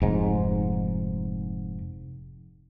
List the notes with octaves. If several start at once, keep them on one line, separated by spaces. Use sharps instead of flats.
F1 G#2